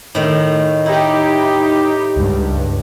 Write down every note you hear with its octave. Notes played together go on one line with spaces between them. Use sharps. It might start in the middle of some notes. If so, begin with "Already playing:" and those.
A2 D#3
D#4 E4 G4
C#2 G2